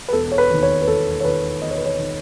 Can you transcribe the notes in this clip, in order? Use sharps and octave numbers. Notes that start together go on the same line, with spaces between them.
B4
E1 A4
C#5
B4
D#2 D#3
C#5
B4
E1 A4
C#5
D#2 D#3 B4
E1 D#5
C#5
B4
C#5
D#3